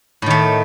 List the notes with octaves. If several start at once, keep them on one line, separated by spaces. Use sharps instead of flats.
A2 D#3 A3